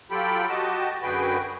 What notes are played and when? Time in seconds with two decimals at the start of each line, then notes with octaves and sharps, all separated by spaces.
0.11 F#3 F4 G4 A4 G5 B5
0.48 F#4 G4 D#5 A5
1.02 F#2 D3 F#4 G#4 B4 G5